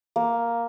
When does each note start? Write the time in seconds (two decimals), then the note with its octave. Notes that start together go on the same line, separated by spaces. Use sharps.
0.16 A#3